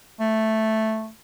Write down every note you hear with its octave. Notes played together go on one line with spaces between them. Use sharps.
A3